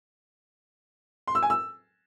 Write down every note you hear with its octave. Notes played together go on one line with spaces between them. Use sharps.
C6
E6
G#5
E6